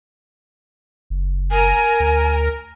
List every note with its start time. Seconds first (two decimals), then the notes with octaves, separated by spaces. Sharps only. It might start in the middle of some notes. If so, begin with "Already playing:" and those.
1.10 F#1
1.51 A#4 G#5
2.00 D2